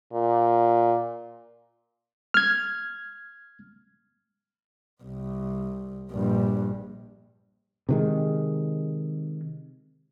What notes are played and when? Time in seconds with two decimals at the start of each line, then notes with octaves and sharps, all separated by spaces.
0.13 A#2
2.34 F6 G#6
5.03 C2
6.11 A#1 G2
7.89 C3 D#3 G#3